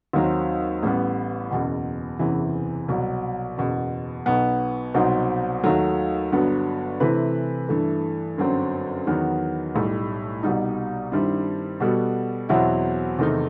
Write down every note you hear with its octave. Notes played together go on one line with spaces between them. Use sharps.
D#2 D#3 F#3 C4
A1 A2 G3 B3
F#1 E2 B2
F#1 E2 C3 E3
C2 B2 F#3
F#1 E2 B2
B1 B2 F#3 B3
C2 B2 F#3 C4 D#4
D#2 D#3 F#3 A3
G1 G2 F#3 B3 F#4
C3 E3 A3 E4 B4
G2 E3 A3
G1 F#2 F#3 C4
E2 D#3 F#3 B3
B1 A2 G3
C2 B2 G3 D#4
G2 D#3 G3 C4 E4
B2 G3 B3 F#4 A4
E2 B2 F#3 C4 E4
E2 C3 D#3 A3 D#4